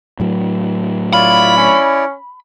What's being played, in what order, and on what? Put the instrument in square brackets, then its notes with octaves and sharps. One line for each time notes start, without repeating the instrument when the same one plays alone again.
[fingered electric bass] A2 F#3
[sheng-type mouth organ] E4 C#5 D5 [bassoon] F4 [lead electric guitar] B5
[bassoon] C#4